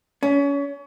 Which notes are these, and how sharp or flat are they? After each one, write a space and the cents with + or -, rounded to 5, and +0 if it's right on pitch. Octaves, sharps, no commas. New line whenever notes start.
C#4 +30